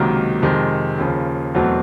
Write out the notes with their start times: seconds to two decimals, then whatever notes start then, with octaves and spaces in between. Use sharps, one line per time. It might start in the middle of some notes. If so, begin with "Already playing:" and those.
Already playing: C#2 C3 D#3 F#3 A#3
0.42 F2 C3 D#3 G#3
0.98 D#2 C#3 F3
1.55 E2 B2 F#3 A3 C4